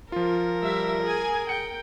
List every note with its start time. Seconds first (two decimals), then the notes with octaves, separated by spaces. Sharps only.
0.12 F3 F4 A#4
0.63 G3 E5
1.02 G#4 G#5
1.49 G5 C#7